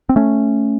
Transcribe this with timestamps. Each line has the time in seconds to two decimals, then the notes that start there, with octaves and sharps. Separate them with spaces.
0.09 C4
0.16 A3 C#4